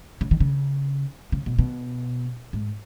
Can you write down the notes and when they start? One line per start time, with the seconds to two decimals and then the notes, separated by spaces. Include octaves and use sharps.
0.21 C#3
0.31 D#3
0.40 C#3
1.32 C#3
1.46 B2
1.59 B2
2.53 G#2